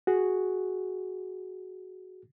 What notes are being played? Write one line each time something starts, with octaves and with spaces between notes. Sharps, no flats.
F#4 G#4